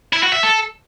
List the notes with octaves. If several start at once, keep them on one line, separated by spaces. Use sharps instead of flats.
E4
F#4
E5
A4